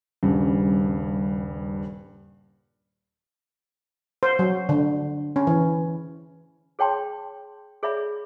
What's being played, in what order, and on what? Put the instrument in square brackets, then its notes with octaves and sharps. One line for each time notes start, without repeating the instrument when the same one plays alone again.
[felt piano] D#1 G2 C#3
[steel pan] C5
F#3
D3
C#4
E3
[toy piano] G#4 C#5 G5 A5 C6
G#4 C#5 D5 E5 B5